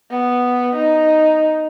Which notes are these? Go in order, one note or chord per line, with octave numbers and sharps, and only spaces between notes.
B3
D#4